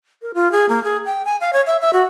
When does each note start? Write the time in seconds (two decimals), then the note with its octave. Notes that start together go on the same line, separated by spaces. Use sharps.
0.22 A#4
0.34 F4
0.52 G#4
0.69 A#3
0.84 G#4
1.05 G5
1.25 G#5
1.41 F5
1.53 C#5
1.67 E5
1.81 E5
1.93 F#4